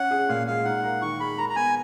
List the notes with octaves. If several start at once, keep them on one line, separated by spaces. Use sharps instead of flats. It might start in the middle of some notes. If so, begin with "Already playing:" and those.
Already playing: C#4 F#5
G#4
A#2 F5
G#3 F5
D#4 F#5
A#4
D#3 C#6
G#3 B5
A#4 A#5
A#5
B3 G#5